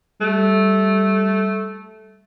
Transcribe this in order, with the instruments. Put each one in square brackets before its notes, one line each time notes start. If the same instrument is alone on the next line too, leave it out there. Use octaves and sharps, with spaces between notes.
[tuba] G3 [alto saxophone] A3